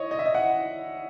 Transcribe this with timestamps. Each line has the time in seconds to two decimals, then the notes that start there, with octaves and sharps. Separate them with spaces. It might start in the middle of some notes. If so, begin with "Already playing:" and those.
Already playing: C#5 D#5
0.11 D#5
0.19 E5
0.26 D#5
0.35 F#5